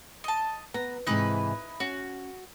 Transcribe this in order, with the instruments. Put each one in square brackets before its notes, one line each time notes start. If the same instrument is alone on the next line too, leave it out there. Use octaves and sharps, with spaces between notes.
[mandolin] D#5 A5
[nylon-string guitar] B3 [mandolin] A#5
[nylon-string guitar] G#2 C3 E3 [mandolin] D#4 E4 B4
[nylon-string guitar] C#4 [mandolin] F#4